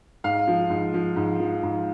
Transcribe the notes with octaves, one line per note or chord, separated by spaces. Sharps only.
G#2 F5
F3
G#2
F3
G#2
F3
G#2